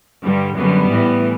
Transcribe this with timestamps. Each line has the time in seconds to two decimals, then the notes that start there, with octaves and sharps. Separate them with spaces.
0.24 G2 D3 G3
0.58 F#2 D3 G3 B3
0.92 A2 E3